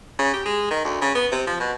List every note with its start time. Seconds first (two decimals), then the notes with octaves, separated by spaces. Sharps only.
0.19 C#3
0.34 G4
0.45 G#3
0.71 D#3
0.85 D2
1.02 C#3
1.15 B3
1.31 C3
1.47 F3
1.60 B2